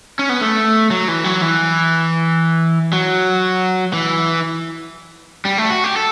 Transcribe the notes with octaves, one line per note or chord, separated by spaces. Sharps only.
C#4
B3
A3
F#3
E3
F#3
E3
F#3
E3
G3
A3
F#4
G4
A4